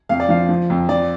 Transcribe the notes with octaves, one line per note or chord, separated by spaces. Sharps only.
F2 F5
D5
F3 F5
F3
F2
F3 D5